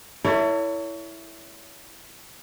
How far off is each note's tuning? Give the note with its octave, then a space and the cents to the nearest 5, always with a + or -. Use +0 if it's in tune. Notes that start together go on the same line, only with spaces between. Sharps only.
E4 +0 A4 +40 C#5 +30